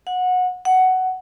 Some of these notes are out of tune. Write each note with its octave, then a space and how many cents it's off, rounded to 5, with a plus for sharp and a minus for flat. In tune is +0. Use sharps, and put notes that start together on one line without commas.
F#5 -20
F#5 +10